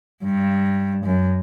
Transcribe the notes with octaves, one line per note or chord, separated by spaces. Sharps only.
G2
F#2